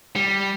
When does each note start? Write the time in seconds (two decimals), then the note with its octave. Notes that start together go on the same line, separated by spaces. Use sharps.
0.16 G3